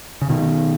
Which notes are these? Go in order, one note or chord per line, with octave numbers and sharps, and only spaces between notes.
C#3
B2 D#3